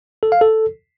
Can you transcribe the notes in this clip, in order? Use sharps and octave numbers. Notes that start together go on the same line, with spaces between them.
A4
F5
A4